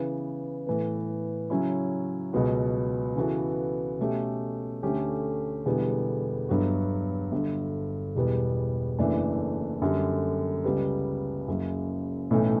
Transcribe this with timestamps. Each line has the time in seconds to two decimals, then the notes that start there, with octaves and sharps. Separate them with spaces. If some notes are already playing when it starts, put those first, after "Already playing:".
Already playing: C#3 E3 B3
0.67 A2 E3 B3
1.50 C#3 F#3 C#4 E4
2.33 C#2 B2 F#3 B3 F#4
3.16 C#3 E3 B3 F#4 A4
3.99 B2 A3 C#4 G4
4.83 D2 D3 A3 C#4 G4
5.66 E1 E2 D3 G3 B3
6.49 G1 G2 F#3 B3 F#4
7.31 G1 G2 D3
8.15 E1 E2 B2 G3 B3
8.98 F#1 F#2 E3 A3 D4
9.82 F#2 D3 G3
10.64 C#2 C#3 G3 B3
11.48 F#1 F#2 C#3 F#3
12.31 B1 A2 E3 A3 C#4